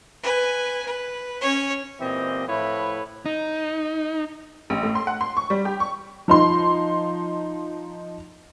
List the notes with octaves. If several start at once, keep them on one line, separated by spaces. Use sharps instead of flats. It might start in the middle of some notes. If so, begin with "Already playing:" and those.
B4 G#5
B4
C#4 C#5
A#2 E3 C4 G4 D#5
A2 F3 E4 B4 C#5
D#4
A1
A2
C6
F#5
C6
C#6
G3
G4
C#6
F3 D#4 C6